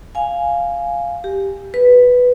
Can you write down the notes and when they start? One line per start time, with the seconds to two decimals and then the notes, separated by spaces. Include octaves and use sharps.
0.15 F5 G#5
1.24 G4
1.74 B4